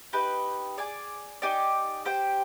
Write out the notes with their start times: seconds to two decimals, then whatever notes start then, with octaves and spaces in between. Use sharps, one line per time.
0.13 D#4 G4 B4
0.78 G#4 D5 G#5
1.42 D#4 G4 D5 G#5
2.05 G4 C5 G5